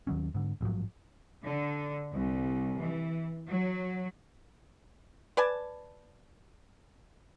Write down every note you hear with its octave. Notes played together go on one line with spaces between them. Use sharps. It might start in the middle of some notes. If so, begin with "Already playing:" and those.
D#2 D#3 F#3 C#4
G#2 D3
A1 G#2 F3 F#3
D3
C2
E3
F#3
B4 D5 G#5 A5